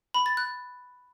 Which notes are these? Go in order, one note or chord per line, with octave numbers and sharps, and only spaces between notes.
B5
A6
F#6